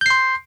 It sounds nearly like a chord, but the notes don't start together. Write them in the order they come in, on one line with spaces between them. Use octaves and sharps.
G6 C7 C6